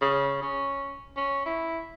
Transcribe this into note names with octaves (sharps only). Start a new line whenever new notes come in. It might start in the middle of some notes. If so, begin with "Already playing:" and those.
C#3
C#4
C#4
E4